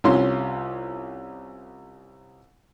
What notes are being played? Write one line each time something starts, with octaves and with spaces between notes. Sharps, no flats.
C2 C3 C#4 F4 C6